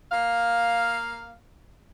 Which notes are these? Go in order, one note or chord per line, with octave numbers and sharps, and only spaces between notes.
A#3 F5